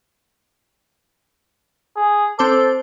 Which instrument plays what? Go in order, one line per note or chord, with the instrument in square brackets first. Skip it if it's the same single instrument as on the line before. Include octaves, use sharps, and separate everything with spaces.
[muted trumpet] G#4
[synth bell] C4 C5 D6 [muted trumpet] A4